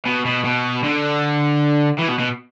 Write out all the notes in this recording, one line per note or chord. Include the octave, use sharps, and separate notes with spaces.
B2
B2
B2
D3
E3
B2
B2